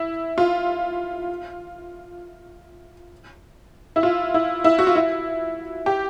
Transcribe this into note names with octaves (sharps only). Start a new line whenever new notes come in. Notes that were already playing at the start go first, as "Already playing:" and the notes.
Already playing: E4
F4
E4
F4
E4
E4
F#4
F4
E4
G4